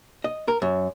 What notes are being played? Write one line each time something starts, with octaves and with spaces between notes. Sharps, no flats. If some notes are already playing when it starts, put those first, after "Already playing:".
D#5
A#4
F#2